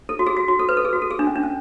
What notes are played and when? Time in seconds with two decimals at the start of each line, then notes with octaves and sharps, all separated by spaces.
0.09 A4
0.19 F#4
0.27 G#4
0.37 F#4
0.48 F#4
0.59 A4
0.69 B4
0.77 A4
0.85 G#4
0.93 F#4
1.02 A4
1.11 G#4
1.19 D4
1.27 C#4
1.36 D4
1.43 C#4